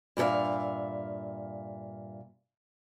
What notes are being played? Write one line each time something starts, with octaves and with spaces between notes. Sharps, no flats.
G2 A#2 A4 E5 F5